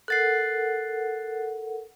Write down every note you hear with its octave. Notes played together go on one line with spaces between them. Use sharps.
A4 A#4 F#5 F#6 A6 C7